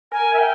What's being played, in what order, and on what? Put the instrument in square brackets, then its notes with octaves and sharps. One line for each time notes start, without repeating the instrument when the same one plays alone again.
[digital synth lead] A#4 [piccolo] G#5
[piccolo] E5
G5